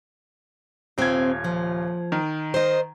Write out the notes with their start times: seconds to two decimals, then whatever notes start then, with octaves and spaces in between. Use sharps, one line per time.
0.98 D#1 C3 C4 F4 G#6
1.44 F3
2.12 D#3
2.54 C5 D#5